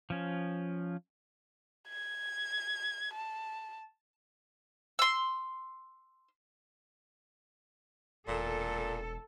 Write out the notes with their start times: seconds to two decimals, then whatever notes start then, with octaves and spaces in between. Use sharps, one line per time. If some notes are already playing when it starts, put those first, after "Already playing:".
0.10 F3 C#4
1.88 G#6
3.14 A5
4.99 C6 E6
8.28 E1 A#2 A4